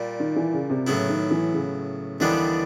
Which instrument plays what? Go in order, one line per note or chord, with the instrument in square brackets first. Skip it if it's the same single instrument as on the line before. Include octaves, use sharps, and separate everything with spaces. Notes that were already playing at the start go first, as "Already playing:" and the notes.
Already playing: [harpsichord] A#2 G3 A#3
[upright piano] D#3
E3
C#3
C3
[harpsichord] A2 F#3 B3 E4 [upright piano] C#3
[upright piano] D#3
E3
C#3
[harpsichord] D#2 D3 G3 B3 D4 [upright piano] E3